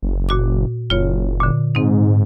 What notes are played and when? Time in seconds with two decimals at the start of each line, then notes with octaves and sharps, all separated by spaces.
0.02 F#1
0.29 A#2 F#4 D6
0.90 F#1 F4 C#5
1.40 A#2 D3
1.75 G#2 C4 D#4